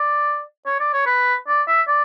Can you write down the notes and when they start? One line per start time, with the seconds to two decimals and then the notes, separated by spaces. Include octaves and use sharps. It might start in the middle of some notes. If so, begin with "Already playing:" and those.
Already playing: D5
0.66 C#5
0.80 D5
0.93 C#5
1.06 B4
1.48 D5
1.68 E5
1.88 D5